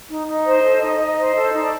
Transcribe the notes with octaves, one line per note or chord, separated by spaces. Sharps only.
D#4
D#4 D#5
C5
A4
D#4
D#4
C5
A4
D#4
D5